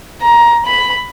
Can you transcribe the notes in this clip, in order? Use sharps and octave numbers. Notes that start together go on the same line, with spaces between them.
A#5
B5